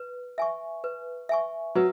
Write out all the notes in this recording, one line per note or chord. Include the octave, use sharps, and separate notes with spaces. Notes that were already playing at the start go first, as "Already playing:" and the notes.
Already playing: B4
E5 G#5 C#6
B4
E5 G#5 C#6
F#3 B4